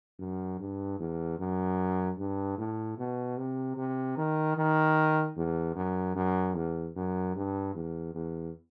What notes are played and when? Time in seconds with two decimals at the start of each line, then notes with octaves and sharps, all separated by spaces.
0.19 F#2
0.60 G2
0.99 E2
1.39 F#2
2.18 G2
2.58 A2
2.98 B2
3.38 C3
3.77 C3
4.17 D#3
4.57 D#3
5.37 E2
5.75 F#2
6.16 F#2
6.55 E2
6.96 F#2
7.36 G2
7.75 E2
8.15 E2